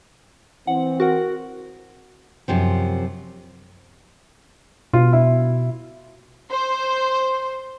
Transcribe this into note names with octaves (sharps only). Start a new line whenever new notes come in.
E3 C4 F#5
F#4 A#4 F#5
F#2 C3 F3
B2 F4
E4
C5